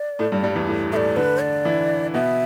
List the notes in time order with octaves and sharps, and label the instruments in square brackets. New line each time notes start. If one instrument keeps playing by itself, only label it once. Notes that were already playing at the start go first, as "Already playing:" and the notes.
Already playing: [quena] D5
[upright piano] A2 A3
G2 G3
G2 G3
E2 E3
A2 A3
[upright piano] A2 A3 [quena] E5
[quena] D5
[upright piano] D3 D4 [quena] B4
[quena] D5
[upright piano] E3 E4
[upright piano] B2 B3 [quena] E5